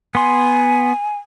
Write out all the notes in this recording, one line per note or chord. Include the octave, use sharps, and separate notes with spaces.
B3 G#5 C6